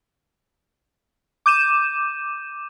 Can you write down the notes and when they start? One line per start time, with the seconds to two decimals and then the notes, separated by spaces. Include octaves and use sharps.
1.46 D6 G6 D#7 E7